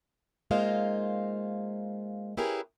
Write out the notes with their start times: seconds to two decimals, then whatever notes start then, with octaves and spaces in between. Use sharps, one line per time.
0.51 G#3 A#3 D#4 F4 C5 F5
2.37 C#4 E4 G4 G#4 A#4 B4